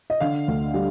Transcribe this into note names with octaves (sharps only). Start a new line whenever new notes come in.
D#5
D3 F5
D2
G3